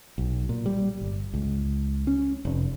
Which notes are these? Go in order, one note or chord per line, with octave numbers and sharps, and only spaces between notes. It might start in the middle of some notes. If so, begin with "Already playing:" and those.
B1
A#2
G3
G1
C#2
C#4
F1